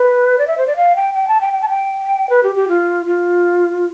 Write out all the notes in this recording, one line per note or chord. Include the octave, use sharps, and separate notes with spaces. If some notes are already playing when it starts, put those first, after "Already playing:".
Already playing: B4
D5
E5
C5
D5
F5
G5
G5
A5
G5
G5
A5
G5
B4
G4
G4
F4
F4